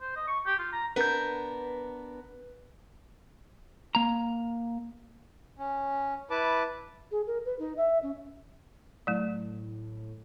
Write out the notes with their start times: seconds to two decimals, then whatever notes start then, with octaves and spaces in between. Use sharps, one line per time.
0.01 C5
0.16 D#5
0.27 C#6
0.46 G4
0.59 F4
0.73 A#5
0.96 B3 D4 A#4 B4 G6
3.95 A#3 A#5
5.59 C#4
6.30 E4 B4 A5 D6
7.11 G#4
7.27 A#4
7.45 B4
7.59 D#4
7.77 E5
8.03 C#4
9.07 A2 F#3 A3